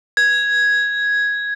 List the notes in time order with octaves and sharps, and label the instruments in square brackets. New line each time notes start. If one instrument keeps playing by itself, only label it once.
[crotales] G#6